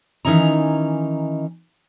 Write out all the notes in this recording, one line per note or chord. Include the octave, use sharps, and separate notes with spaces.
D#3 E3 C#4 D#4 A#5